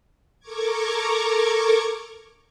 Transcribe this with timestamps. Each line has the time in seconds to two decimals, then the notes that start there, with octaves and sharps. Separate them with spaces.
0.39 A4 A#4 A#5 C#6 D6 G#6